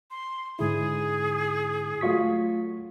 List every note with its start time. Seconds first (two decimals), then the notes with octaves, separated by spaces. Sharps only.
0.11 C6
0.59 G#2 D3 E4 G#4
2.01 F#3 A3 F4 F#4 C#6 B6